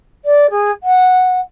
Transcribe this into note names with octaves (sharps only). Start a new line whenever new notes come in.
D5
G#4
F#5